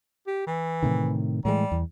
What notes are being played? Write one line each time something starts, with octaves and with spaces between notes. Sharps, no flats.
G4
E3
A2 C3 D#3
A2 E3 G3 G#3
E2